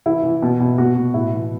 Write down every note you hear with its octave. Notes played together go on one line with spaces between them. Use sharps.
E3 E4
E3
B2
B2
B2 F#4
B2
A2 E4
E3